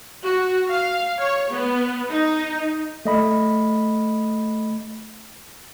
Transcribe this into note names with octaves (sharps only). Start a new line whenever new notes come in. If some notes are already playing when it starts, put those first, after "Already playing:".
F#4
F5
C#5
B3
D#4
A3 D#5 B5